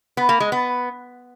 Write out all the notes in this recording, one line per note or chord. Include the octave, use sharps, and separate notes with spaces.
B3
A#3
G#3
B3